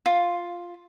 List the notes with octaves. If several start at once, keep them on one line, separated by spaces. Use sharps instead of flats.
F4